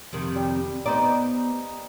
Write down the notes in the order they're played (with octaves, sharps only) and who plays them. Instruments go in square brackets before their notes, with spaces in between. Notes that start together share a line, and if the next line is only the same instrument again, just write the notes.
[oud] F2 C3 D#3
[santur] G3
[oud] B3 C5 D5 [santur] D#4